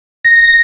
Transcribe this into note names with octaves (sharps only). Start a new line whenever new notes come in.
A#6